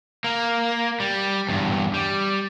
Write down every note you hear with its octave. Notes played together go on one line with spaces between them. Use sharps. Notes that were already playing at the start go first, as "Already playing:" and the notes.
A#3
G3
E2 G2
G3